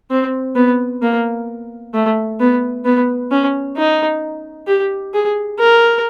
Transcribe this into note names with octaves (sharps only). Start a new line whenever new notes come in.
C4
B3
A#3
A3
B3
B3
C#4
D#4
G4
G#4
A#4